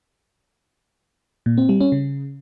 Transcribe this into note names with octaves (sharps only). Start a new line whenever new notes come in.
A#2
C4
G3
C#4
C#3